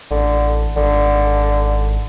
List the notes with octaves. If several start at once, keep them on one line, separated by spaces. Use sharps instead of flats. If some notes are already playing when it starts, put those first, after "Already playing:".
A1 D3
G#1 D3